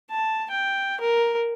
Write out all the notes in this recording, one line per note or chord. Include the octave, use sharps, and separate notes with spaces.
A5
G5
A#4